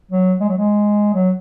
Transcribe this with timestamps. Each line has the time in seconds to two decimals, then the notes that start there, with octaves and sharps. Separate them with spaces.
0.12 F#3
0.40 G#3
0.49 F#3
0.58 G#3
1.14 F#3